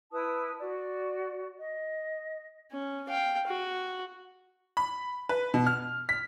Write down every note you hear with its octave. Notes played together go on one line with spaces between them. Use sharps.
E4 B4 A5 D#6
F#4 D5
D#5
C#4
F5 G5
F#4
B5
B4
B2
F6
B6